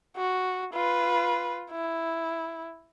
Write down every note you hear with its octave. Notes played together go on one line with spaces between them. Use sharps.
F#4
F4 B4
E4